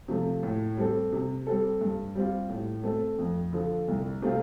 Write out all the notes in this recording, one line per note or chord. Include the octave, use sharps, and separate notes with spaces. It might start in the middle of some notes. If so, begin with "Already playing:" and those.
C3 F3 A3
A2
G3 C4 A4
C3
G3 C4 A4
G2
G3 C4 F4
A2
A3 C4 A4
F2
D3 F3
C2
C3 A3 C4 F4